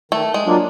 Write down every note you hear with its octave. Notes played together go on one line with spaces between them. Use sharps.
D#3 A3
G#3
F#3 A#3 D4 F4